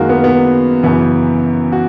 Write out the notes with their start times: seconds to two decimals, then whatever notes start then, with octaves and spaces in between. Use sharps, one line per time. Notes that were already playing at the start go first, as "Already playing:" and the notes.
Already playing: F#2 D#3 G#3 A#3 F#4
0.09 B3
0.24 B3
0.83 F#2 C#3 E3 B3
1.72 F#4